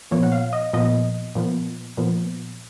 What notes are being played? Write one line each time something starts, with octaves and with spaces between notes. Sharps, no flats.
A#2 F3 B3 C#5
F#5
F5
D#5
A#2 F3 B3 D#5
A#2 F3 B3
A#2 F3 B3